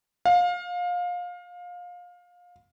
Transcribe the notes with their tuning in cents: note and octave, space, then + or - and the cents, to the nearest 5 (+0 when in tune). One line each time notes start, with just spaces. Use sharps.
F5 +25